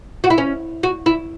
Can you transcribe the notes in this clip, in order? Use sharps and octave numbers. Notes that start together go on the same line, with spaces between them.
F#4
E4
C#4
F#4
E4